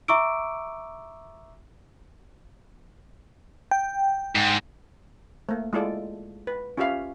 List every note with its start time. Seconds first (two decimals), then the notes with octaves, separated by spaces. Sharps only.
0.08 E5 A#5 C#6 D6 E6 D7
3.71 G5
4.36 G#2
5.49 A3 A#3
5.73 G#3 E4 F4 A4 D5
6.47 B4
6.77 C#4 F4 G4 C#5 E5 F5